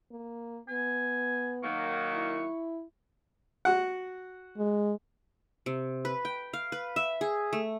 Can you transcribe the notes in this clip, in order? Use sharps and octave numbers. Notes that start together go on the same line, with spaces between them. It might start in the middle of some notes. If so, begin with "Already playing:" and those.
A#3
B3 G#5
D#3 F#3 A#3 C#6
E4
F#4 F#5
G#3
C3
B4
G5
F5
B4
E5
G#4
A3